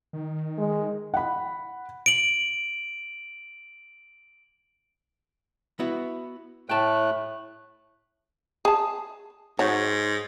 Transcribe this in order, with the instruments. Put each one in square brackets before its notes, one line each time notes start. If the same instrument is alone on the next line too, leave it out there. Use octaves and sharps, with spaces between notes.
[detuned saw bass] D#3
[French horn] G#3
[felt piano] F#5 B5
[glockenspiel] D7 F#7
[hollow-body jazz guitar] B3 E4 F#4
[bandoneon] A2 A3 F#6 [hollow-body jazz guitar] G5 A5
[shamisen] G#4 A5
[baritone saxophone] G#2 [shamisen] F#4 C#5